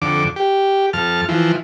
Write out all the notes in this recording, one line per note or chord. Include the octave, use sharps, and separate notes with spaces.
F2 D3 D6
G4
F2 A5 F6
E3 F3